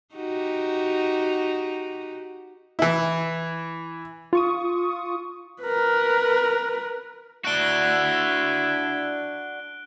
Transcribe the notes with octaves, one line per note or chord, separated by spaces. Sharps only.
D#4 F#4 G4
E3 E4
F4 C#6 D#6
A#4 B4
D4 E4 F#4 F#6 D7 G7